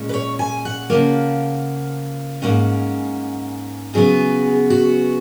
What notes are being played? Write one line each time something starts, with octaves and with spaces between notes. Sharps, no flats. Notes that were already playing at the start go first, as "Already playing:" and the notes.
Already playing: A#2 G#3 C#4
B4
C#5
G#5
F#5
C#3 F3 A#3
G#2 F3 A#3 C#4 F#5
C#3 F#3 B3 G#4
F#4